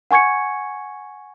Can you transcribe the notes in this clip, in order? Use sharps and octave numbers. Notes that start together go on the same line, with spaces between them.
F#5 G#5 C#6 G#6 C#7